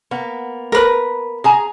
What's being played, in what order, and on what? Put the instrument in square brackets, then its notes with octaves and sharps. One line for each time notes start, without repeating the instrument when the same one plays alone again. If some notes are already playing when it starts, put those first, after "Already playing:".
[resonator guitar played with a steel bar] A#3 B3
[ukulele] A#4 B4
[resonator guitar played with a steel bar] G#4 G#5 A#5